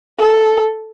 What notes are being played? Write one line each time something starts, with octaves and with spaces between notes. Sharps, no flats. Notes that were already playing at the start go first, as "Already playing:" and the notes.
A4